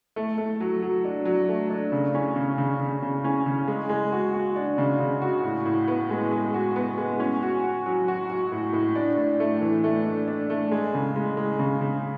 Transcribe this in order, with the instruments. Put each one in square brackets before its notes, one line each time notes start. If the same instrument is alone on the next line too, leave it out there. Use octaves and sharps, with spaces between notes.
[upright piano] A3
A3
F#3
F#3
D4
F#3
A3
D4
C#3
C#4
C#3
C#3
C#3
C#3
C#4
C#3
G#3
G#3
F#4
F#4
D4
C#3
C#3
F#4
A2
A2
B3
G#3
G#3
F#4
B3
G#3
C#4
F#4
F#4
F#3
F#4
F#4
A2
A2
D4
A2
A3
E3
A3
D4
D4
A3
G#3
C#3
G#3
G#3
C#3
C#3